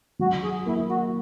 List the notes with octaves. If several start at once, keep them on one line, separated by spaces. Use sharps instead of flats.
F#3 F#4
G#4
A#3 E4
F#4